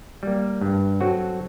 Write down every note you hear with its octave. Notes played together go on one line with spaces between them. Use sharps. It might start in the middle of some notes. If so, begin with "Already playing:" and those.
G3 A#3
G2
F#3 C4 F#4 A4